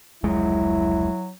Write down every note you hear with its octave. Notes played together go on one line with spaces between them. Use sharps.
F1 C#2 F#3 G#3 E4